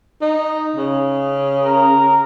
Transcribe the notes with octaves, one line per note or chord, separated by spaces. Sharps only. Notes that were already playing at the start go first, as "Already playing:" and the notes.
D#4
C#3
A#4